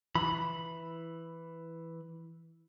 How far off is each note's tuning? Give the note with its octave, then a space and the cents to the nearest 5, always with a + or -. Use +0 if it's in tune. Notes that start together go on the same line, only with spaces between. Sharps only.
E3 +0 B5 +0